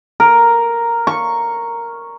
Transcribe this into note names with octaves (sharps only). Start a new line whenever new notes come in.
A#4
C#6